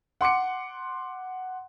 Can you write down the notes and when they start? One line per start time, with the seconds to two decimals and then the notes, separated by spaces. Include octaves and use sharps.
0.21 F#5 C6 D6 C#7